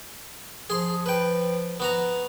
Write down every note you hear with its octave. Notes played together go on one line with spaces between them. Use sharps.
F3 G#4 C6
B4 G5
B3 F#4 A#5